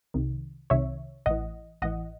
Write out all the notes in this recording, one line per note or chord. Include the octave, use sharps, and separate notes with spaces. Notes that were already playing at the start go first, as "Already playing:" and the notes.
C2 C3 D#3
C2 C3 D#3 C#5 E5
A1 A2 E3 D#5 F#5
A1 A2 E3 D#5 F#5